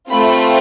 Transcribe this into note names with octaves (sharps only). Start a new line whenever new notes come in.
A3 C4 F4 B5